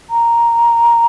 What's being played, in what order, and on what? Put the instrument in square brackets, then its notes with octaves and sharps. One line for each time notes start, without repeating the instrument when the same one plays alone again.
[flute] A#5